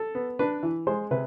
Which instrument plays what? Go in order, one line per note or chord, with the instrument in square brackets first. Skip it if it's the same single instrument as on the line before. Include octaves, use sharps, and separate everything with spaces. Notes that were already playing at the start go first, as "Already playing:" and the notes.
Already playing: [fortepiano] A4
B3
D4 B4
E3
G#3 C5
C3 B4